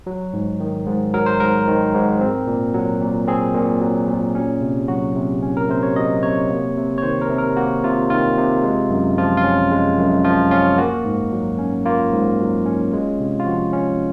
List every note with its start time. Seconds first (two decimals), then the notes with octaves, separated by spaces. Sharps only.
0.07 F#3
0.33 G#2
0.60 D#3
0.86 G#2
1.14 F#3 A#4
1.26 C5
1.40 G#2 A#4
1.67 D#3
1.94 G#2
2.21 C4
2.47 A#2
2.74 F#3
3.02 A#2
3.28 C4 G#4
3.54 A#2
3.81 F#3
4.09 A#2
4.35 C#4
4.62 C3
4.88 F#3 F#4
5.16 C3
5.43 C#4
5.57 A#4
5.69 C3 C5
5.83 C#5
5.96 F#3 D#5
6.23 C3 C#5
6.50 A#3
6.77 C3
6.98 C#5
7.03 D#3 C5
7.22 A#4
7.30 C3
7.38 A#4
7.57 A#3 F#4
7.83 C3 F4
8.10 D#3 F4
8.38 C3
8.63 G#3
8.90 F#2
9.18 F3 F4
9.37 F4
9.44 C#4
9.71 G#3
9.98 F#2
10.25 F3 F4
10.51 C#4 F4
10.78 A#3 F#4
11.05 G#2
11.32 F#3
11.59 C#4
11.85 A#3 F4
12.13 G#2
12.39 F#3
12.66 C#4
12.93 G#3
13.20 C3
13.40 F4
13.46 F3 F#4
13.73 C#4